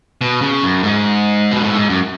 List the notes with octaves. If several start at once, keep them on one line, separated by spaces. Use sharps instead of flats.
B2
C#3
F#2
G#2
B2
A2
G#2
F#2